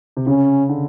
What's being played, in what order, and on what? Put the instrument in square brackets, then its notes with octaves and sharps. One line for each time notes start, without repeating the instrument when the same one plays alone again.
[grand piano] C3
[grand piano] C#3 [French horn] C#4
[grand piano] D3